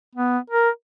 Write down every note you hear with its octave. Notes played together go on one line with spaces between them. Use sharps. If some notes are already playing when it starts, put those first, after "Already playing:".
B3
A#4